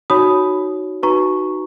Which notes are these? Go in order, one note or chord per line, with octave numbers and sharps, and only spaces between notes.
D#4 F#4 C#5 B5 D#6
D#4 F#4 B4 A#5 C#6